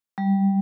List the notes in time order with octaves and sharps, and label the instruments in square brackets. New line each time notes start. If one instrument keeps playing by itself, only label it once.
[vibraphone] G3